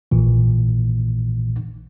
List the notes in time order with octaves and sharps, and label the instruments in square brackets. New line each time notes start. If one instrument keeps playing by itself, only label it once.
[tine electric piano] A#1 A#2 E3